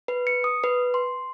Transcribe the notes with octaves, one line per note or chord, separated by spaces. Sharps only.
B4
C#7
D#6
B4
C6